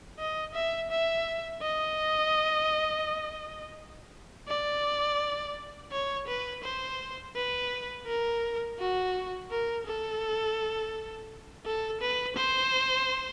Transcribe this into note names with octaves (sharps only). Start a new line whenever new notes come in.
D#5
E5
E5
D#5
D5
C#5
B4
C5
B4
A#4
F#4
A#4
A4
A4
B4
C5